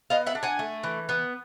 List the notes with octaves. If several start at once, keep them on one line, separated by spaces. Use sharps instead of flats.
B3 D#5 F5
E5 F#5
D4
F#5 G#5
A3
E3
B3